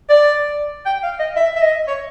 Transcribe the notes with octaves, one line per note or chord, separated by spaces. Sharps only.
D5
G5
F5
D#5
E5
E5
D#5
C#5